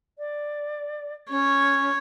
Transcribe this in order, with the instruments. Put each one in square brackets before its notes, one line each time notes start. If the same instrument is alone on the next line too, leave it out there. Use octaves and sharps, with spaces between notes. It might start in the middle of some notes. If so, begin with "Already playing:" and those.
[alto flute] D5
[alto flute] C#4 [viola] C#5